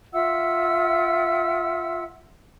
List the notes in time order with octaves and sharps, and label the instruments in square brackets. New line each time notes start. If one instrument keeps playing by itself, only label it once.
[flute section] F4 E5 F#5 E6